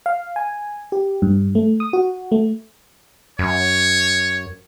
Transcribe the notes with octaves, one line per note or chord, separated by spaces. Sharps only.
F5
G#5
G4
G2
A3
D#6
F#4
A3
F#2 C#5